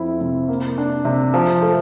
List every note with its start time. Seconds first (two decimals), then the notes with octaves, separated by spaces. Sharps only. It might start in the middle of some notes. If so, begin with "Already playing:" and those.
Already playing: F2 C4 E4
0.21 C3
0.48 A#3
0.78 D4
1.05 C3
1.34 F3
1.62 A3